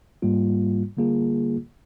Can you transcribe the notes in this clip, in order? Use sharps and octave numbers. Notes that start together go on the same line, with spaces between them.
G#2 G3 A#3 F4
D3 G3 A#3 F4 G#4